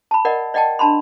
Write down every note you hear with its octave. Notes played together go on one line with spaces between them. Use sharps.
A5 B5
A#4 D5 D#5 F#5
D5 D#5 F#5 G5 A5
D4 A5 B5 C6